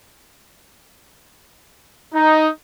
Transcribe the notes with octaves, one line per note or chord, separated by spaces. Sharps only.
D#4